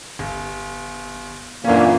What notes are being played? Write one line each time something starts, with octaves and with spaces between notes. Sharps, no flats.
G1
F#2 A#2 D3 E3 A#3 C#4